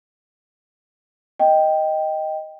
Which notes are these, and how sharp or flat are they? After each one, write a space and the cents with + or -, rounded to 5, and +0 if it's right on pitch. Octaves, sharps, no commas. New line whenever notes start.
D#5 +5 G5 +0